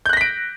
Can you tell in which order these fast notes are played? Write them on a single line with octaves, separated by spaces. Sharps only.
G6 F#6 A#6 B6 D7